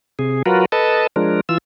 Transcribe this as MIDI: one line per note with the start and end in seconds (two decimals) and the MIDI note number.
0.19 0.42 48
0.19 0.42 68
0.46 0.65 54
0.46 0.65 65
0.46 0.65 66
0.46 0.65 70
0.46 0.65 71
0.72 1.07 69
0.72 1.07 71
0.72 1.07 75
0.72 1.07 81
1.16 1.41 53
1.16 1.41 56
1.16 1.41 62
1.16 1.41 70
1.49 1.58 52
1.49 1.58 65
1.49 1.58 88